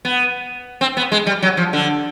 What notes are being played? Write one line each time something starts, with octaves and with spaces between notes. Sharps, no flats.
B3
C4
B3
G#3
G3
F#3
F3
D3